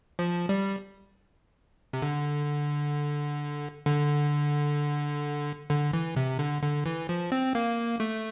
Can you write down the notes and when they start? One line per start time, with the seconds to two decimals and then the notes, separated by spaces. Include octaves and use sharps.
0.19 F3
0.49 G3
1.93 C3
2.02 D3
3.86 D3
5.70 D3
5.93 E3
6.16 C3
6.39 D3
6.63 D3
6.86 E3
7.09 F3
7.32 C4
7.55 A#3
8.00 A3